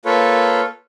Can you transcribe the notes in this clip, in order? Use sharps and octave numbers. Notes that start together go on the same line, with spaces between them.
A#3 F4 A4 B4 C#5